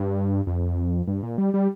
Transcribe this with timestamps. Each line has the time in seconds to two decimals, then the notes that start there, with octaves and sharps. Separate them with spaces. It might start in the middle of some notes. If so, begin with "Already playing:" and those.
Already playing: G2
0.47 F2
1.08 G2
1.23 A#2
1.38 G3
1.54 G3